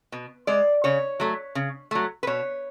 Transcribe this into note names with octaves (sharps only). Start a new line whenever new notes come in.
B2
G#3 D5
C#3 C#5
F#3 A3
C#3
F#3 A3
B4
B2 C#5